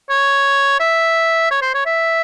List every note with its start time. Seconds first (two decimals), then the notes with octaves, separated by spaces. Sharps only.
0.10 C#5
0.80 E5
1.51 C#5
1.62 C5
1.75 C#5
1.86 E5